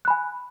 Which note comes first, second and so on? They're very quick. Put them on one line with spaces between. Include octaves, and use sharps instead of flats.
F#6 B5 G#5